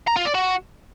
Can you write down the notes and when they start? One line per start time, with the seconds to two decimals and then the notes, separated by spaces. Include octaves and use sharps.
0.08 A#5
0.17 F4
0.26 D5
0.35 F#4